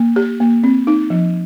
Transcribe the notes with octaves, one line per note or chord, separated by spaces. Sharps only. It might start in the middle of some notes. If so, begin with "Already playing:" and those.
Already playing: A#3
G4
A#3
C4
D#4
F3